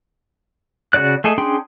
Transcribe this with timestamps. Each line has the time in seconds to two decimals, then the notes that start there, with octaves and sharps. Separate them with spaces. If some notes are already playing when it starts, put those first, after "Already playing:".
0.93 C#3 F4 F#4 D5 F#6
1.24 A3 G#4 A4 D#5
1.38 C#4 D4 G#4 G5 C6